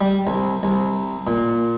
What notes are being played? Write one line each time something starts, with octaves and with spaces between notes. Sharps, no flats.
G3
C2
C2
A#2